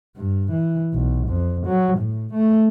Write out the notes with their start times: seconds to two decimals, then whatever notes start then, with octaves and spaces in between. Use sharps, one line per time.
0.17 G2
0.52 E3
0.94 B1
1.28 F2
1.67 F#3
1.98 A2
2.34 A3